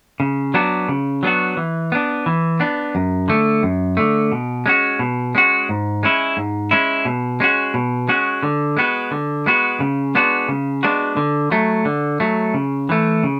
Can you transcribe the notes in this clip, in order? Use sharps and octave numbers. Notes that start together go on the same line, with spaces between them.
C#3
F#3 B3 D4 F#4
C#3
F#3 B3 D4 F#4
E3
B3 D4
E3
B3 D4
F#2
D3 A3
F#2
D3 A3
B2
G#3 C#4 F#4
B2
G#3 C#4 F#4
G#2
G#3 C#4 E4
G#2
G#3 C#4 E4
B2
G#3 C#4 F#4
B2
G#3 C#4 F#4
D3
G#3 B3 F#4
D3
G#3 B3 F#4
C#3
G#3 B3 D4 F#4
C#3
G#3 B3 D4 F#4
D3
F#3 A3
D3
F#3 A3
C#3
E3 A3
C#3